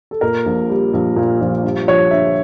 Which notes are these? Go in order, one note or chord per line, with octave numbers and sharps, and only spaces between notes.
A4
A#2 A#4
A#1
G3
A#1
A#2
A#1
G2
F3 C#5
D3 E5